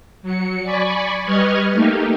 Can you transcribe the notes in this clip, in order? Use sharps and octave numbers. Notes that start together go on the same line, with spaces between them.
F#3 C#7
D5 G#5 B5 C#6
G3 B4 D#5 C#6 F6 G#6
A3 A#3 D#4 G4